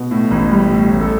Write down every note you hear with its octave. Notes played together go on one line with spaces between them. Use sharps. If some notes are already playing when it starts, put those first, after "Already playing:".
Already playing: B2
A2
A1
G3
A2
A1
A4